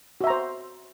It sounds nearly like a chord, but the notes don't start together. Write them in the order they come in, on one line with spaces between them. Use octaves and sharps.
F#4 E5 A#5 C5